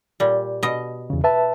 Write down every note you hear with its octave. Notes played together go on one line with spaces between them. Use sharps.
A#2 G3
B2 D#5
E2 C#3
B4 E5 A5